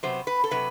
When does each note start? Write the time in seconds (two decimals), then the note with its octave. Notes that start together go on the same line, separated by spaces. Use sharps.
0.03 C3 F#3 B3 C5
0.27 B4
0.44 A4
0.51 C3 F#3 B4